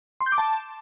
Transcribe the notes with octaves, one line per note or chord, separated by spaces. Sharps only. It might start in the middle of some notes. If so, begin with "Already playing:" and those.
C6
G6
D6
A5